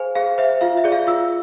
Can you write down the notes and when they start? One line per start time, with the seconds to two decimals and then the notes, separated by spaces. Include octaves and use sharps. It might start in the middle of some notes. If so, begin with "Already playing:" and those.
Already playing: G#4 C5 F5 G#5
0.15 G#4 F5
0.38 C5 E5
0.61 F4 F5
0.77 E5
0.84 G#4 D5
0.92 F5
1.07 F4 E6